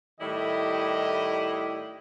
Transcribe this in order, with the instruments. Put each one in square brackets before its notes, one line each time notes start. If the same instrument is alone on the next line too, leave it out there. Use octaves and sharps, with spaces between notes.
[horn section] A2 D#3 G3 E4 G4 D#5